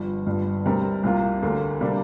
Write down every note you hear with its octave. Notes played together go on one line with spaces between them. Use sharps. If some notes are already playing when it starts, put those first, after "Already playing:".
Already playing: G1 G2 F3
G1 G2 F3
D2 C3 G3 C4 A#4
C2 C3 A#3 F4
D2 D3 A#3
C3 G3 A#3 D4